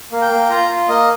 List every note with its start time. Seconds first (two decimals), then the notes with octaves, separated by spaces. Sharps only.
0.12 A#3
0.22 G5
0.31 A#3
0.50 F4 A#5
0.69 F4
0.88 A#3 D#5